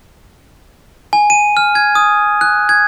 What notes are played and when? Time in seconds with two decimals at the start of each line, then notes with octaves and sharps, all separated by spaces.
1.13 G#5
1.30 D#7
1.57 F6
1.75 G#6
1.95 D#6
2.41 F#6
2.69 G#6